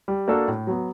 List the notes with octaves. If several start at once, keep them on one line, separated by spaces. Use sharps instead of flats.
G3
A#3 D4 F#4 A4
A2
F#3 B3